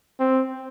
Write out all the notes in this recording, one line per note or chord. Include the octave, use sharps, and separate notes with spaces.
C4